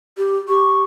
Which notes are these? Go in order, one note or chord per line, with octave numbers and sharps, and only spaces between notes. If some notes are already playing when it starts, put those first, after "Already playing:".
G4
G4 C#6